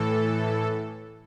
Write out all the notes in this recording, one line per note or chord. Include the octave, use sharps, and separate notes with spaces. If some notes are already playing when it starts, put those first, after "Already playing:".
Already playing: A2 E3 A4